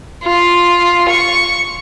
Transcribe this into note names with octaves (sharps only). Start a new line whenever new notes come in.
F4
C#6